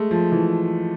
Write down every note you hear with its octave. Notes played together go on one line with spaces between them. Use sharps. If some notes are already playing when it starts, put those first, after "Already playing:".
Already playing: G#3 A3
F3
E3